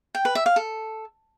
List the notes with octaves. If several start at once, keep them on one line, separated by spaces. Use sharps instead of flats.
G5
B4
E5
F5
A4